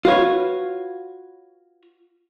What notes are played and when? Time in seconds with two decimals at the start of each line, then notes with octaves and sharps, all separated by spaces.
0.05 F4 F#4 B4 C#5